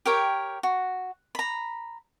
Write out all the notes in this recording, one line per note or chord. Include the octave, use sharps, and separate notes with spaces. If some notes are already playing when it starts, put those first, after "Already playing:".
G4 A#4 C#5 G5
F#4
A#5 B5